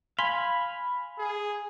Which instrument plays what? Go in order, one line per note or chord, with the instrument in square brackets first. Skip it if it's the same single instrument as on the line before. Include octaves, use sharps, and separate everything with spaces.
[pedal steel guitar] F5 G#5 [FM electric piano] B5 [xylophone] C6
[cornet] G#4